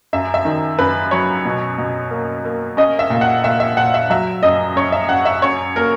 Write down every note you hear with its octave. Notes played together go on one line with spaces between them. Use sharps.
F#2 E5
E5
D#3
F#2 B4
F#3 C#5
B2
B2
A#3
A#3
C#4 D#5
E5
A#2
F#5
A#2 E5
E5
A#2 F#5
E5
F#3 E5
F#2 D#5
F#2 C#5
E5
F#2 F#5
E5
F#2 C#5
A#3 A#4